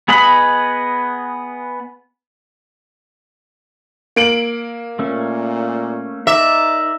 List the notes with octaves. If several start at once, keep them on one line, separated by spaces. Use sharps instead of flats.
B3 G#4 D#5 F#5 B5
A#3 D7 F#7
A#2 A3 C#4
D#4 A#4 D5 E5